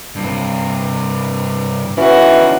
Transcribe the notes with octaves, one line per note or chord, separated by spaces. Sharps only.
G2 C3
E3 C#4 D#4 F#4